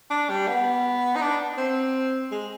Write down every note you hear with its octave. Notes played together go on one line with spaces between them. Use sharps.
D4
G3
B3
D#4
D4
C4
G#3